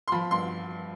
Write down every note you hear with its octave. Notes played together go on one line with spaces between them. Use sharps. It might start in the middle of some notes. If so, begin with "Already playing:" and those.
C6
F3 B5
G2 C6